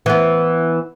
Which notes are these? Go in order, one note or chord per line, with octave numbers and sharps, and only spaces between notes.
E3 B3